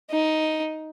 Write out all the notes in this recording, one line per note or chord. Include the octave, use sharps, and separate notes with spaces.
D#4